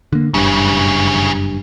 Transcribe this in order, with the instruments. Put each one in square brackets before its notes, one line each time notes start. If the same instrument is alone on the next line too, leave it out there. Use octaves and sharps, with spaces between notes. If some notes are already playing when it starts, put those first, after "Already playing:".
[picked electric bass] D3 A#3
[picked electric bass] F#1 G2 [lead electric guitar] C#3 E3